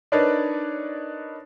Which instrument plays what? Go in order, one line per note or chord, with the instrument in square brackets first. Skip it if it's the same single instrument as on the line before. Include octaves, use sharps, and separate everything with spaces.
[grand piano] D4 D#4 A#4 B4 C#5 D5